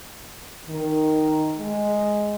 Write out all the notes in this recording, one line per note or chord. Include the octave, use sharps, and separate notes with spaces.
D#3
G#3